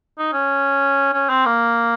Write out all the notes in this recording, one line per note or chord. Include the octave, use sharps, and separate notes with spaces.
D#4
C#4
C#4
C4
A#3